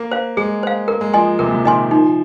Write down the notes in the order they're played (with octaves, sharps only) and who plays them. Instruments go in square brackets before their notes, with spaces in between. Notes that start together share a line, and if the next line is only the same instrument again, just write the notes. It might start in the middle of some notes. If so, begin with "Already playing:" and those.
Already playing: [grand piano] A#3
[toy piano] C5 F5
[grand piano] G#3 [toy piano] G#4
[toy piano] C5 F5
[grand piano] A#3 [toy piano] A#4
[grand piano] G#3
[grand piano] F3 [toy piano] D#5 G#5 C6
[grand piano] F3
[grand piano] C3 [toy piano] A#4
[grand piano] A#2
C3
[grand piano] D#3 [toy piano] D#5 G#5 C6
[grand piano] F3 [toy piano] D#4